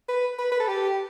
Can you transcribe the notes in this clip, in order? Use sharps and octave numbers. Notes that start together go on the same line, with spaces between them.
B4
B4
B4
A4
G4